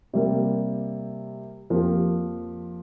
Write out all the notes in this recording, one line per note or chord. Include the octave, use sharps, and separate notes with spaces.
C3 G3 A#3
F2 F3 A#3 G4